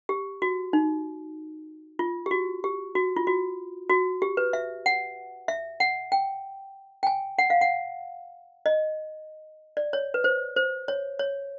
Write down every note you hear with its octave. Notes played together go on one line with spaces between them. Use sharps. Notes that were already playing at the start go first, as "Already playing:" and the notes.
G4
F#4
D#4
F4
G4
F#4
G4
F#4
F4
F#4
F#4
G4
B4
E5
F#5
E5
F#5
G5
G5
G#5
F#5
F5
F#5
D#5
D5
C#5
B4
C5
C5
C#5
C#5